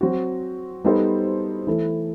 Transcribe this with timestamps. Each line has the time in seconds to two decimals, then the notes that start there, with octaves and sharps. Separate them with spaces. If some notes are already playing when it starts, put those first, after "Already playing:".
0.01 F#3 C4 F#4
0.84 G3 B3 D#4 A4 C5
1.67 E3 A3 E4 A4